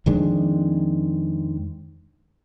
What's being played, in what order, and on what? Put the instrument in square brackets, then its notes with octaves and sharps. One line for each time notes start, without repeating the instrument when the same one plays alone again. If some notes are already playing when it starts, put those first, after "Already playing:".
[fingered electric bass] F2 D#3 G#3 D4